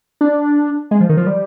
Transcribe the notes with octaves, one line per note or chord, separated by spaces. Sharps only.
D4
G#3
F3
D#3
F3
G3